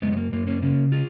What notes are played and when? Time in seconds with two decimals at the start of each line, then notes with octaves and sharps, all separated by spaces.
0.02 F#2 G#3 B3
0.13 B3
0.17 A#3
0.32 F#2 A#3
0.47 A#3 C#4
0.62 C#3 A#3 C#4
0.92 F4 G#4